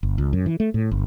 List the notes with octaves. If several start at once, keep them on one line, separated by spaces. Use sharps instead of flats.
G1
C#2
F#2
E3
A3
A2
G1